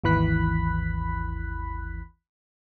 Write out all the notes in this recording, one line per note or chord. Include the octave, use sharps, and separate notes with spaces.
G#1 D#2 E3 B5 F#6 B6